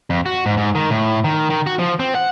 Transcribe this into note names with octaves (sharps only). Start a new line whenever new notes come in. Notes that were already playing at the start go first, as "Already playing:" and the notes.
F2
F#4
G#2
G#2
D#3
A2
D#3
D#3
F#4
F3
C4
F#5